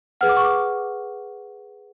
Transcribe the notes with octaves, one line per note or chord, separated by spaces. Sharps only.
G#4 B4 F#5 F6
D6
C#6
D6